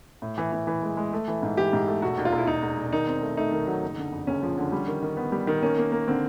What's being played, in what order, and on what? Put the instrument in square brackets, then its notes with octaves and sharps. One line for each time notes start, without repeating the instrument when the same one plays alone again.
[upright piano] A2
E3
E3
E3
G#3
G#3
A3
E3
G#2
[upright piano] E3 [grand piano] G4
[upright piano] G#2
A3
[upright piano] E1 [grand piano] F#4
[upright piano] D#2
[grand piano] F4
[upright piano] E1
[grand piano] E4
[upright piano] E1 [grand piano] D#4
[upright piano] E1
E1
[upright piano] D#3 [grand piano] D#4
[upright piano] C4
A3
[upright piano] A3 [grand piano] D#4
[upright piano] D#3
F#3
F#1
D3
F2
[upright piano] F#1 [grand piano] C#4
[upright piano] F3
D3
G3
D#3
D#3
B3
G3
D#3
[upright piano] A#3 [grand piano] C#4
[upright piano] A#3
A#3
[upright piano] D3 [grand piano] C4